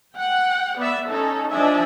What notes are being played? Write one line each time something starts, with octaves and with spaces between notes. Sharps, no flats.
F#5 G5
B3 D5 E5
C#4 D#4 A4
F3 D4 D#5 E5 G#5